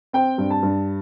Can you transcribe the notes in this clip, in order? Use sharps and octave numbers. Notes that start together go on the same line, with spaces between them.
C4 G5
G2
A5
G2